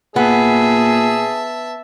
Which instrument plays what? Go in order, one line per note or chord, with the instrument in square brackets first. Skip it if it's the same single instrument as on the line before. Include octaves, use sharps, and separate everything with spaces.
[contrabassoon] A#2 [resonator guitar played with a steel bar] B3 [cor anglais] G#4 [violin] E5 A5